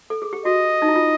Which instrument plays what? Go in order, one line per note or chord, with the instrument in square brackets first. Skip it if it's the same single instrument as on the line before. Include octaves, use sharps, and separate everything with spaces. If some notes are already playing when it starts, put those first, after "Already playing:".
[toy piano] A4
G#4
G4
[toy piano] F#4 [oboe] D#5
[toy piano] D#4
E4
F4